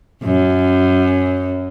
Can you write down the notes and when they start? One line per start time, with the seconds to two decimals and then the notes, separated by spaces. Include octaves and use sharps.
0.24 F#2